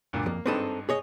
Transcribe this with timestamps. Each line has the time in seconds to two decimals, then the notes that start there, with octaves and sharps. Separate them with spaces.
0.13 D2 G2 A#2
0.26 F2 A#3
0.46 G#1 G2 C4 D#4 A4 B4
0.89 G#4 C#5 D#5